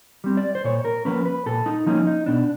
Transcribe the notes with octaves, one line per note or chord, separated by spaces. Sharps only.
G3 C4
D5
C5
A#2 C#5
A#4
F3 A#3 C#4 B4
B4
A#2 A4
D#4
F3 A#3 C#4 D#4
D#4
B2 D4